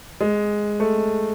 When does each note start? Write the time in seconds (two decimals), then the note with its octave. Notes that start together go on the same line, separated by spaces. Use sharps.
0.21 G#3
0.80 A3